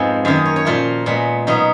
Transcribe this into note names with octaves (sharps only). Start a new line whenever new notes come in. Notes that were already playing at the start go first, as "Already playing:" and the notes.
Already playing: F2 G#2 F3 G#3 B3 D#5
F#2 D#3 A#3 F5
D#5
C#5
C#5
A#2 F3 A#3 F4
A#2 G#3 B3
B2 F#3 B3 D#4